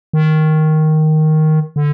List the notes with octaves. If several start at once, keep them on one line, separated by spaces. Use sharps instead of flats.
D#3
D3